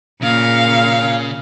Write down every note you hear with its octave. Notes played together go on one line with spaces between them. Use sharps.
A#2 C#3 F5